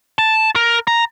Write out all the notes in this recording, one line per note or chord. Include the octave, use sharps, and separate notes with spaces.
A5
A#4
A#5